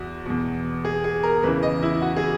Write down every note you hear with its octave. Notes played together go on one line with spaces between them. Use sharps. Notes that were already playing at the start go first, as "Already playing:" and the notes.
Already playing: E2 F#4
E2 B2
G#4
G#4
A#4
E2 C#3 E3 B4
D#5
E4
F#4
G#4